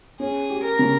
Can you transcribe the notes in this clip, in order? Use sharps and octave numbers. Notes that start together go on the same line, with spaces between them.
C#4 G#4
G4
A#4
C#3